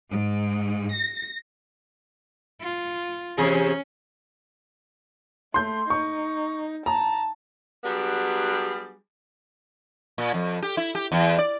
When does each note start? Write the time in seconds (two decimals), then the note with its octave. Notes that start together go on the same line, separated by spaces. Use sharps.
0.11 G#2
0.95 A#6
2.61 F4
3.38 E2 C3 C#4 G#4
5.54 A3 C6 G6
5.90 D#4 C#6
6.86 A5 A#5
7.83 F#3 G3 B3 D4 G4 G#4
10.18 A#2
10.34 F2
10.62 G4
10.77 E4
10.95 G4
11.12 E2
11.38 D5